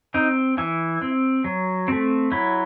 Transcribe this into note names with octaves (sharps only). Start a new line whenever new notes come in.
C4 D#4
E3 E4
C4
F#3
A3 C4
F#3 E4